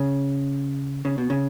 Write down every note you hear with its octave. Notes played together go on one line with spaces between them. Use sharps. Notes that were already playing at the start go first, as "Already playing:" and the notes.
Already playing: C#3
C#3
B2
C#3